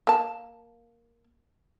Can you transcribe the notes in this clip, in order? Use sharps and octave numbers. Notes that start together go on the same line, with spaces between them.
A#3 A5